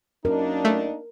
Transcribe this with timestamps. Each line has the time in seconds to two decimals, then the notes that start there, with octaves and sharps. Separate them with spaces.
0.25 F#2 A#3 D4 D#4 A#4
0.65 A3